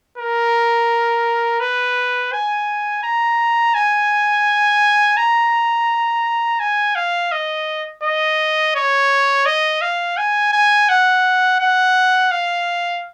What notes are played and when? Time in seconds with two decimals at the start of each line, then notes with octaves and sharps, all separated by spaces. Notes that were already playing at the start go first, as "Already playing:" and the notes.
0.18 A#4
1.60 B4
2.33 G#5
3.03 A#5
3.74 G#5
5.17 A#5
6.60 G#5
6.95 F5
7.32 D#5
8.03 D#5
8.75 C#5
9.46 D#5
9.81 F5
10.17 G#5
10.52 G#5
10.89 F#5
11.59 F#5
12.31 F5